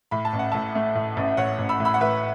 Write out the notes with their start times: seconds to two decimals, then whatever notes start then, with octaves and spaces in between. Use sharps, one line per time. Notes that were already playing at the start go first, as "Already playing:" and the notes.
0.11 A2 B5
0.25 A5
0.33 A1
0.39 F#5
0.52 A2 E5 A5
0.75 A3
0.95 A2
1.17 A1
1.37 A2 C#5 F#5
1.59 A1
1.69 B5 E6
1.80 A2
1.85 B5 E6
1.94 F#5
2.01 A2 B4 E5